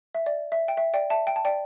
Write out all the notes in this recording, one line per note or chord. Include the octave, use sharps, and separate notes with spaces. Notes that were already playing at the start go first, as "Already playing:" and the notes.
E5
D5
E5
G5
E5
D5 G5
E5 A5
G5
A5
D5 G5